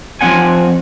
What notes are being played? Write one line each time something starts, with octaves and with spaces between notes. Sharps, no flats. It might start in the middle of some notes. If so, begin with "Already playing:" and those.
F3 B3 C4 F#5 G#5